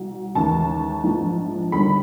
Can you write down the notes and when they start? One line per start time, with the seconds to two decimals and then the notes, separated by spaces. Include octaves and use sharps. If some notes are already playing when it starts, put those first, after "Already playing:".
Already playing: C2 B2 F#3
0.35 D#2 C#3 E3 G#3 A5
1.04 A#1 G#2 F3 G#3
1.72 G1 G2 D#3 G3 B5